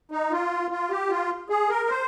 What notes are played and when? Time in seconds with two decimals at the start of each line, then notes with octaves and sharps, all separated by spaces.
0.12 D#4
0.31 F4
0.71 F4
0.90 G4
1.10 F4
1.50 G#4
1.69 A#4
1.89 C5